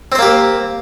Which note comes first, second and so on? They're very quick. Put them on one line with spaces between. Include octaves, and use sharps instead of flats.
C4 C5 A#3 G4